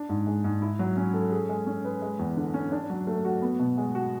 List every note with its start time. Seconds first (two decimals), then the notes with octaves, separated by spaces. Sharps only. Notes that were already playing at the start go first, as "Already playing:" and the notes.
Already playing: D4
0.09 G#2
0.27 G#3
0.44 G#2
0.62 E4
0.79 F#3
0.97 C#4
1.14 A4
1.32 G#4
1.49 G#3
1.67 C#4
1.85 B4
2.02 G#3
2.19 E2
2.37 D3
2.54 C#4
2.72 D4
2.90 F#3
3.07 A3
3.25 F#4
3.42 B3
3.60 B2
3.78 G#3
3.95 F#4